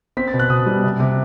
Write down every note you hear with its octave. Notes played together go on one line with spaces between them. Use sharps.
C4 B6
A6
B2
F#6
B2 D#6
G3
C3
C3